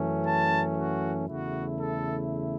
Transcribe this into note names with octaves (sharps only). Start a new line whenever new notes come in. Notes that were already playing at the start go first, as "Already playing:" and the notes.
Already playing: F#2 E3 A3 C#4
A5
F#4
E2 C#3 A3 E4 F#4
A4